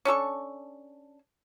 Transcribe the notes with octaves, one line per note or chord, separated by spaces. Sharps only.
C#4 D4 A4 C#6